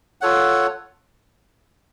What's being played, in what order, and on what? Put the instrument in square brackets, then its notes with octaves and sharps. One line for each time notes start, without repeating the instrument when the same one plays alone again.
[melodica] F4 A4 C#5 F#5